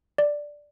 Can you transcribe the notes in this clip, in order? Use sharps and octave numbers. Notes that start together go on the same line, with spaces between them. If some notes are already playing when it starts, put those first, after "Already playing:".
D5